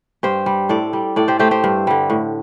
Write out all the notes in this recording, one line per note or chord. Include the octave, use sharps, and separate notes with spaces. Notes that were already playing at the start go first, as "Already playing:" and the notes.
G2 G4 C5
G3
A2 A4 D5
G3
A2 A4 D5
G4 C5
A3 G4 C5
G4 C5
G2
D3 G3
A2